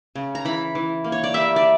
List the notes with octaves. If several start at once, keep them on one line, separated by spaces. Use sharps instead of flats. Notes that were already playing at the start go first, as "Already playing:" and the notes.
C#3
A#5
E3 B5
E3
A#3
C#5
D5
G3 E5
D5